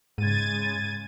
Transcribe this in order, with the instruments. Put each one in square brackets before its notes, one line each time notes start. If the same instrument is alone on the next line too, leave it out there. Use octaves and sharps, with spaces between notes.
[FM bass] G#2 [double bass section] C#3 G#3 [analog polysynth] G#6 A6 D#7